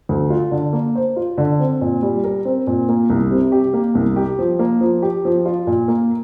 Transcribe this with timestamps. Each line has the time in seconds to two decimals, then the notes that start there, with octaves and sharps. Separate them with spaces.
0.09 D2
0.30 F4
0.51 D3
0.73 A#3
0.95 C5
1.16 F4
1.38 D3
1.59 C4
1.81 A#2
2.02 G3
2.24 A#4
2.45 C4
2.67 A#2
2.89 A#3
3.09 C2
3.31 C3
3.52 G4
3.74 A#3
3.95 C2
4.16 G4
4.39 F3
4.59 A#3
4.81 F3
5.02 G4
5.25 F3
5.46 F4
5.67 A#2
5.88 A#3